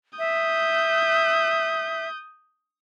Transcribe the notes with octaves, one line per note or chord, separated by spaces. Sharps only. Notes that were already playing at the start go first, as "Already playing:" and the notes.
E5 D#6 G6